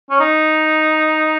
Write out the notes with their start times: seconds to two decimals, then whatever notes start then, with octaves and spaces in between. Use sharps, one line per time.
0.10 C#4
0.20 D#4